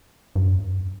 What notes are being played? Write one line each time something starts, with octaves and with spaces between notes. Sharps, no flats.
G2
F#2
E2
G2
F#2
G2